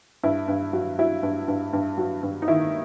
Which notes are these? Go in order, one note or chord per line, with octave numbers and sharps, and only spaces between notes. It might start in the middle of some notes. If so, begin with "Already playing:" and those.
G2 E4
G2
F#3
F#3 E4
G2
G2
G2
F#3
G2
D#4
D#3 E4